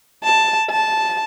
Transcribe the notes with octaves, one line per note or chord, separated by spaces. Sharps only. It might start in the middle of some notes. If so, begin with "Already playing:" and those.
A5
A5